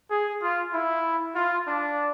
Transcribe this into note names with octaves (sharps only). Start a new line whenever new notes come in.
G#4
F4
E4
F4
D4